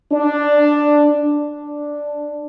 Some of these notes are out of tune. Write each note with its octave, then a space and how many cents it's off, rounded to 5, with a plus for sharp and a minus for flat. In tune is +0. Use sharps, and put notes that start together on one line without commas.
D4 +5
D4 +0